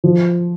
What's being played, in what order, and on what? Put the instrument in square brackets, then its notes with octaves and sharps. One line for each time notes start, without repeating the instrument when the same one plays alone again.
[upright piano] F3